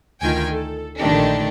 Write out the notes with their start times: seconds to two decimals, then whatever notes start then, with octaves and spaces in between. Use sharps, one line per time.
0.21 D2 D#3 F4 G5 G#5
0.52 A4
0.98 A#1 D3 D#3 A3 D4 G4